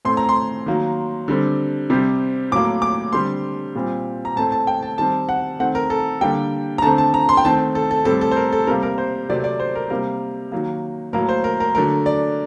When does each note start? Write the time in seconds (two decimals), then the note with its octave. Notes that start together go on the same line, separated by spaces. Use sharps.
0.05 A2 A3 C4 C6
0.17 A#5
0.29 C6
0.66 D#3 F#3 A#3
1.28 D3 G3 C4
1.90 C3 G3 C4
2.51 A2 F#3 A#3 D6
2.82 D6
3.13 D3 G3 C4 C6
3.75 A#2 G3 C4
4.25 A#5
4.36 A2 A3 C4 A5
4.52 A5
4.67 G5
4.82 A5
4.98 D#3 G3 C4 A5
5.29 F#5
5.59 D#3 A3 C4 F#5
5.75 A#4
5.90 A4
6.21 D3 G3 A#3 G5
6.78 A#5
6.82 D3 A3 C4 A5
6.98 A5
7.14 A#5
7.29 C6
7.37 G5
7.45 D#3 A3 C4 A5
7.75 A4
7.91 A4
8.05 A2 G3 C4 A4
8.21 A4
8.31 C5
8.36 A#4
8.53 A4
8.67 C3 G3 A#3 A#4
8.83 A#4
8.98 C5
9.29 C3 F#3 A3 C4 D5
9.44 D5
9.60 C5
9.75 A#4
9.90 C3 G3 A#3 A#4
10.52 D#3 F#3 A#3
11.13 A2 F#3 A#3 A#4
11.29 C5
11.44 A#4
11.60 A#4
11.75 D3 F#3 A3 A#4
12.06 D5